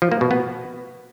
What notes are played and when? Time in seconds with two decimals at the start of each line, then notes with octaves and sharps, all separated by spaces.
0.02 F3
0.11 A#3
0.21 B2
0.31 B3